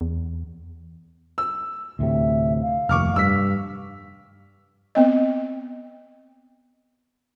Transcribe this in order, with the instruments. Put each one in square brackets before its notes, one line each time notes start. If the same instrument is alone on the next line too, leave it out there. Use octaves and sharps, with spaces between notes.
[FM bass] E2
[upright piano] E6
[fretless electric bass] D2 A2 C3 [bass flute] E5
[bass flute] F5
[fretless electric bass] F1 D#2 [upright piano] C#6 D6 F6
[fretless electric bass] G2 [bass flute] G3 [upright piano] E6 B6
[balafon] B3 C4 D#5